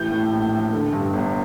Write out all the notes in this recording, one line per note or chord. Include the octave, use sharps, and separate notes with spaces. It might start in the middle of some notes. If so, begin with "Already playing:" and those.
Already playing: A1 E3 G6
A2
A#1
A#1
D3
G2
G1